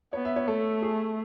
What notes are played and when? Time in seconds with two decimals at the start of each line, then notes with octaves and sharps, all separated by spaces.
0.13 B3 C#5
0.25 E5
0.36 C#5
0.48 A3 A4
0.82 G#4